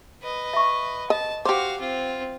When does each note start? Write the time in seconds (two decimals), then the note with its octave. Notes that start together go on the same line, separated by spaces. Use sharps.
0.22 B4 D#5
0.54 E5 C#6
1.10 D#5 A5
1.45 F#4 G4 C5 F5 D6
1.79 C4 F4